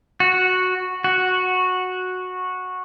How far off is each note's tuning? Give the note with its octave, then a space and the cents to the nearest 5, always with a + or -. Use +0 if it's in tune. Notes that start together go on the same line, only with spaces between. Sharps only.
F#4 -5
F#4 -10